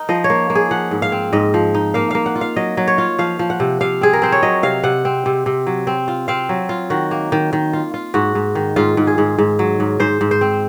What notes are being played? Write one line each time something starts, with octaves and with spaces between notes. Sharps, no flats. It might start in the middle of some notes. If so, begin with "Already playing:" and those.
Already playing: D#4 A#4
F3 D#5
C#5
A#3
A#3
G#4
F3 F#5
G#2
F5
C4
G#2 D#5
F3
D#4
A#3 F5
A#3 F5
F#5
F4
F5
F#3 D#5
F#3
C#5
F4
F3 F5
F3
F#5
C3
C3 F5
C4 G#4
A#4
C4 C5
C#5
F#3 D#5
C3 F5
C3 F#5
C4
C3
C3
F#3
C4
F4
C4 F5
F#3
F4
D#3 F#4
A#3
D#3
D#3
F4
F4
G#2 F#4
G#2
D#3
G#2 F4
G#2
G#4
G#2
G#2
F#3
G#2
G#2 C5
G#2
C5
C4